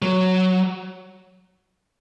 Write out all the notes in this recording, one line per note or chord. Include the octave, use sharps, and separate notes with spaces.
F#3